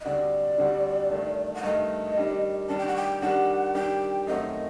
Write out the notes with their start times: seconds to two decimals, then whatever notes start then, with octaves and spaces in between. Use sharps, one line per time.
0.01 D#5
0.05 D2 D3 G3 C4 F#4 D5
0.58 D2 D3 G3 C4 F#4
1.11 G2 D#3 A3
1.55 F#5
1.63 G2 D#3 A3 D#5
2.16 D#3 G3 D4
2.69 D#3 G3 D4 A5
2.78 G5
2.87 F#5
2.96 G5
3.22 D#3 G3 D4 G4 F#5
3.74 D#3 G3 D4 G4 G5
4.27 F#2 D#3 A3 C4 F#4 D#5